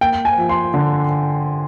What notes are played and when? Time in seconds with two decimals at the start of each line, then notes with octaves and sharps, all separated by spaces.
0.01 A#3 G5
0.25 G#5
0.38 F3
0.49 C6
0.74 D3